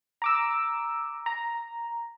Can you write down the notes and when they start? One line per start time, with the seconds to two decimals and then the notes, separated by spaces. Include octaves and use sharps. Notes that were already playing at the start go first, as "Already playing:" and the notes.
0.22 A#5 D6 E6
1.26 A#5